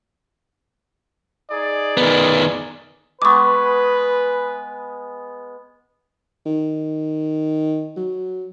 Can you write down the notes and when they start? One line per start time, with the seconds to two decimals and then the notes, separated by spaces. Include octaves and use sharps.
1.51 D#4 G#4 D5
1.97 D#3 B3
3.22 G#3 B3 B4 C#6 D6
6.46 D#3
7.96 F#3